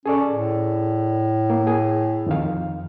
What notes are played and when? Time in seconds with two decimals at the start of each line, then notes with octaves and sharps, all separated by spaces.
0.06 C#4 G#4 A4 D5
0.31 A2
1.50 A#3
1.67 G#4
2.26 F2 D#3 F5